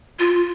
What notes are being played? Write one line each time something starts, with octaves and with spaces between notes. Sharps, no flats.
F4